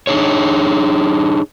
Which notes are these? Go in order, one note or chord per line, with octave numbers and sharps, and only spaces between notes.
D4 D#4 G#4 C#5